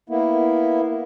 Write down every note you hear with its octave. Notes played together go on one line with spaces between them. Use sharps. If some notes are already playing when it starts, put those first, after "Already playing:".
A#3 B3 E4